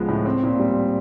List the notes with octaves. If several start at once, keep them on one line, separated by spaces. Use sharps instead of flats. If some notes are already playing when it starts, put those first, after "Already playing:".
Already playing: C#2 F3 G#3 B3
A2
C4
A#2
G3